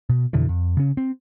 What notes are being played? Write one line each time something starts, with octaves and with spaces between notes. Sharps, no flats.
B2
F2 B2 D3 E3
F2
C#3 C#4
C4